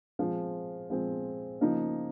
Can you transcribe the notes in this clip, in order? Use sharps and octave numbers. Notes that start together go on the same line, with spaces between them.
F3 G#3 C4
F3 G#3 C4
C#3 F3 A#3 D#4